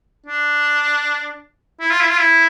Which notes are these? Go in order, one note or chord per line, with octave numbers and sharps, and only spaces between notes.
D4
E4
F4
E4
F4
E4